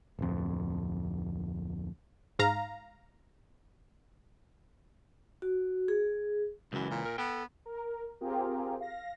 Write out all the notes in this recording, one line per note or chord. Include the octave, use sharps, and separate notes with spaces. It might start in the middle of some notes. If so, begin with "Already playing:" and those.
D1 F2
G#2 F5 A#5
F#4
G#4
C#2 F#2 E3
A#2
A#4
B3 A4 G5
A#4
C4 F4 G4 G#4 A#4
F5 A#6